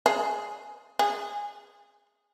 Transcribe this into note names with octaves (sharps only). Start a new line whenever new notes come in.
G#4
G#4